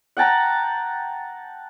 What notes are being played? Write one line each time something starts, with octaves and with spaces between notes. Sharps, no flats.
F#5 G5 A5 A#5